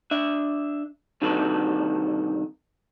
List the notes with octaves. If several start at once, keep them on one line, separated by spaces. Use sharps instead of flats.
D4 E5
G2 C3 D#3 F#4 A4 B4